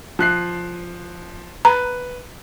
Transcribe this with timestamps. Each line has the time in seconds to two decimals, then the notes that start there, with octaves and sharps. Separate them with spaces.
0.19 F3 F#6 C7
1.65 B4 A#5